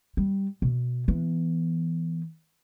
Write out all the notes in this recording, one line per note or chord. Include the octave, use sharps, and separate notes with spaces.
G3
B2
E3 B3